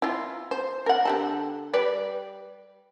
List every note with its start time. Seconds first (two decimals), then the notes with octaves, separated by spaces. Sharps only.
0.02 E4 F4
0.51 C5
0.86 A#4 F#5
1.05 D3 G4 A4
1.73 G3 B4 D5